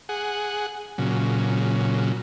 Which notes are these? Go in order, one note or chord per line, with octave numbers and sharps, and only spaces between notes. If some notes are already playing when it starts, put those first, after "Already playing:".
G#4 F#5
A#2 C#3 F#3